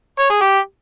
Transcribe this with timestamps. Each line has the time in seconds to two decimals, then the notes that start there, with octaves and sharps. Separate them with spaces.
0.19 C#5
0.30 G#4
0.41 G4